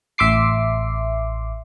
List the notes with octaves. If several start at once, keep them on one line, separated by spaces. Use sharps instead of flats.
A1 E5 C6 D6 C7